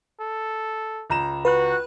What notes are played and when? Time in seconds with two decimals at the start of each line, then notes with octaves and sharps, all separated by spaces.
0.20 A4
1.10 C#2 A#5 E7
1.45 F#4 B4 F#6